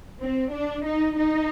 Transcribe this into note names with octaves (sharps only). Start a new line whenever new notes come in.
C4
D4
D#4
D#4